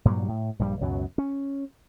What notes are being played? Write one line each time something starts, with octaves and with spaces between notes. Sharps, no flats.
G2 A#2 F#3 G3
A2
A#1 G2 C#3 G3
C#2 F#2 B2 F#3
C#4